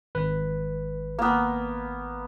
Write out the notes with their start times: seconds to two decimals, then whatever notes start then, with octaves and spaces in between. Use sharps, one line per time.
0.15 G#1 B4
1.19 A#3 B3